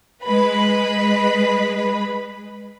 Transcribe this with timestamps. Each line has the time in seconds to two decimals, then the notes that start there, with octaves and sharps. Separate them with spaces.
0.24 G#3 B4 B5